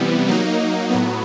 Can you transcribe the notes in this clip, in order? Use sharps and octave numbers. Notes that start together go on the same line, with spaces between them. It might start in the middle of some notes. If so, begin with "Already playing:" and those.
Already playing: C3 E3 G3 B3
F#3 A#3 D#4
A2 F#3 B3